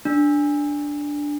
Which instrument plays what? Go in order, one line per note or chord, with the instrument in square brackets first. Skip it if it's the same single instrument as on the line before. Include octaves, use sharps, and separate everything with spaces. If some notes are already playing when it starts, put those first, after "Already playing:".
[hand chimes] D4